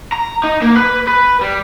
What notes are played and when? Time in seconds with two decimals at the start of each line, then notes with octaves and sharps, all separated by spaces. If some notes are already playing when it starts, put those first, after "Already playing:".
0.12 A#5
0.44 D#4
0.62 A#3
0.76 B4
1.07 B4
1.41 G3